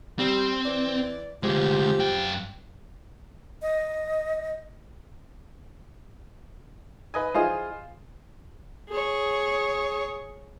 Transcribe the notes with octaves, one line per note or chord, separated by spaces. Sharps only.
G3 C4
E3 D5
D2 F3 G#3 C4 G4
F#2 G5
D#5
B4 D#5 G#5
E4 F4 G#4 C5 D#5
G#4 C#5